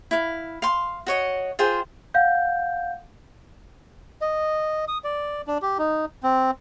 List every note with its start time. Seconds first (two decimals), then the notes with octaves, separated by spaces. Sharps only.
0.11 E4 F5
0.62 F5 C6
1.07 F#4 C#5 D#5
1.59 F4 G#4 C5 G5
2.14 F5 F#5 G6
4.21 D#5
4.88 D#6
5.04 D5
5.47 D4
5.62 G4
5.78 D#4
6.23 C4